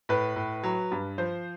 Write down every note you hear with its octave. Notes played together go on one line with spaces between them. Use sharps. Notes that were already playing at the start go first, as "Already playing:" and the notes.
A2 B4
A2
F#3
G2
F3 C5